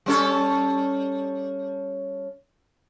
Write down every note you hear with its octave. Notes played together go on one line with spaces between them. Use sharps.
G3 C#4 A4